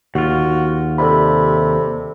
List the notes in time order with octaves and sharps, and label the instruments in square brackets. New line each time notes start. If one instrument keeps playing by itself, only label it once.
[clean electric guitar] D#2 F4 [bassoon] F#4
[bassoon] C3 [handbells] A4 D5 B5